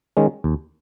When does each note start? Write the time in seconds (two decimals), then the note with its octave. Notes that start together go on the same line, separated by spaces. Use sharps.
0.17 D#3 G#3 C#4
0.44 D#2